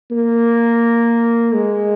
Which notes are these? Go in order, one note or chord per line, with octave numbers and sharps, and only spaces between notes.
A#3
G#3